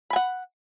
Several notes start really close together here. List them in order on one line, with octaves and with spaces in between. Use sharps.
B5 G#5 F#5